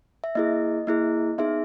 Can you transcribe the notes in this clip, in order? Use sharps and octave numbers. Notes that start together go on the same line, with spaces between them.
E5
A#3 E4 G#4 D#5
A#3 E4 G#4
B3 D#4 G#4 E5